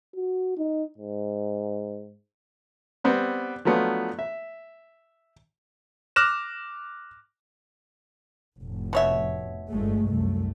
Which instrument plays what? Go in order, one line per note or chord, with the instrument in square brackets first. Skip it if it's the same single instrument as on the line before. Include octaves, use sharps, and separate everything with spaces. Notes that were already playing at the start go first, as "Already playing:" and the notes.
[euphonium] F#4
D#4
G#2
[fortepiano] G3 B3 C4
F3 F#3 A3 B3 D4 F4
E5
[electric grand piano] D6 F6 F#6 A#6 E7
[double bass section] F1 A2
[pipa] B2 C#5 E5
[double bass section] G1 G#3 A3
C2 F#2 A3